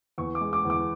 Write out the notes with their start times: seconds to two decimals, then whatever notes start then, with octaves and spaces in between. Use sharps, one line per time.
0.18 E2 C#6
0.35 D6
0.41 G#3
0.53 D6
0.65 E2 D6